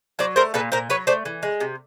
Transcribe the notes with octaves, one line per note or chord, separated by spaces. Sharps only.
F#3 C5 D5
A3 A#4 C5
A#2 A4 B4
A#2 A#4 C5
F#3 B4 C#5
A3 C5 D5
E3
G#3
C3